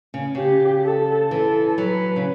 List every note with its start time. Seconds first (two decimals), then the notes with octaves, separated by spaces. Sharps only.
0.14 C#3
0.35 C#3 G4
0.84 A4
1.31 E3 A4
1.78 F#3 B4
2.16 C#3